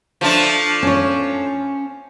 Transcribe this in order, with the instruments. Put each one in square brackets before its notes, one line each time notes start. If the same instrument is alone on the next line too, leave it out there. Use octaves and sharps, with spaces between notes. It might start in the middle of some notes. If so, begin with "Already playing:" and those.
[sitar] F3 A3 D4
[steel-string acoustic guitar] C#4 C#5